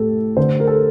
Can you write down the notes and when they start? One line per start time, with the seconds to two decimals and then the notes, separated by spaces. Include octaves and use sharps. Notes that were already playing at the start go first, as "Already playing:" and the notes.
Already playing: A2 A3 G4 A4
0.37 D3 C5
0.60 A#4
0.67 A4